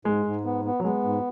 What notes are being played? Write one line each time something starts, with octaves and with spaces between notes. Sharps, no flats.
G#2 G#3
G#2
B3
B3
F#3
G#3 B3
G#2